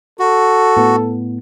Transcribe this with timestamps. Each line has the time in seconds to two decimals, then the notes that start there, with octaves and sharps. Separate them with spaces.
0.19 F#4 A4
0.76 A2 B3